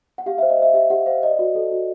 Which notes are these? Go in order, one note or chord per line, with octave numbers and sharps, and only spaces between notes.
F#5
G4 F5
C5 E5
D#5
C5 E5
G4 E5
G4 F#5
C5 F5
D5 D#5
F#4
A4
F#4